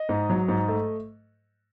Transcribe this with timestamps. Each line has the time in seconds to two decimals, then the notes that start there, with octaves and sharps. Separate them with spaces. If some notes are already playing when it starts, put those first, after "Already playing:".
Already playing: D#5
0.09 G#2
0.30 F#3
0.48 G#2
0.68 A3